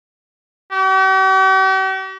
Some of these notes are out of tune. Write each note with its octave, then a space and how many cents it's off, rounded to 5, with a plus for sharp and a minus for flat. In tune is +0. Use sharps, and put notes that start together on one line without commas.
G4 -45